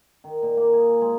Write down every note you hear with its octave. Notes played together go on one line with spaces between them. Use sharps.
D#3
A#2
A#3
G#4
G#3